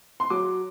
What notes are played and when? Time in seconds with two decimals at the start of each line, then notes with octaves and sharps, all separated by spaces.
0.20 C6
0.30 F#3 D6